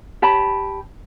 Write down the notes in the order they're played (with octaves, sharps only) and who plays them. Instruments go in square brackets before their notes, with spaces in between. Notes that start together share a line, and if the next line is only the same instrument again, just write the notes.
[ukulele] G4 C#5 A5 B5